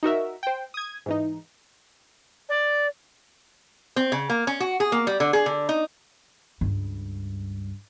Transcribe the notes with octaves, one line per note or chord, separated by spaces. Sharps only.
D#4 F#4 A#4 E5
C5 G5
D#6 G#6
G#2 E3 D#4
D5
C4
C#3
A#3
C#4
F#4
G#4
A#3
G3
D3
G#4
D3
D#4
C#2 G2